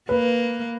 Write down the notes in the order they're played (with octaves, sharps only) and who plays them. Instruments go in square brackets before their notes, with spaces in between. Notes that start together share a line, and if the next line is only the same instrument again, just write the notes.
[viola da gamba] A#3 [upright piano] B4